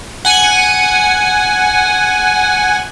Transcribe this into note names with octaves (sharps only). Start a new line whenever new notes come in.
F#5 G#5